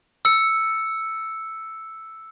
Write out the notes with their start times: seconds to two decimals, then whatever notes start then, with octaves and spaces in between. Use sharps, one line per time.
0.25 E6 C#7